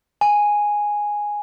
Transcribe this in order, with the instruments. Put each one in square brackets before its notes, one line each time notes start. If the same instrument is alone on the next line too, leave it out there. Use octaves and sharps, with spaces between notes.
[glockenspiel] G#5